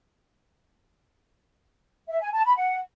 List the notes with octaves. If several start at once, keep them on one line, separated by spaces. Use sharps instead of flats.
E5
G#5
A5
B5
F#5